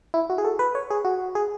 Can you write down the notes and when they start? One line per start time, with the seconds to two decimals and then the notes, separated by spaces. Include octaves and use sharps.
0.14 E4
0.30 F#4
0.38 G#4
0.45 A4
0.59 B4
0.75 C#5
0.91 G#4
1.05 F#4
1.35 G#4